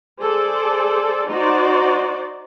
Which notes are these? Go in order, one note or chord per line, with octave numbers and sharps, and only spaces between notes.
G#4 A4 C5 D5
D#4 F#4 C5 D5